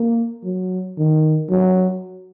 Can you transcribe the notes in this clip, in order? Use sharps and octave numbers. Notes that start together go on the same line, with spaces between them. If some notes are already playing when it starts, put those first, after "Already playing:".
Already playing: A#3
F#3
D#3
F#3